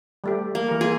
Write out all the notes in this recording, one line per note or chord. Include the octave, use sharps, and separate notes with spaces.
G3 A3 G4
A#3
E3 A#4
A#3 F4 G#4